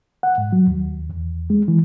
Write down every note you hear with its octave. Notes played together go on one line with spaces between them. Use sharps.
F#5
G#2
F#3
D#2
E2
G#3
E3